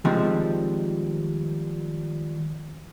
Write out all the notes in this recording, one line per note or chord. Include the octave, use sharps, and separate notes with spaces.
D#3 F3 G3 G#3 C4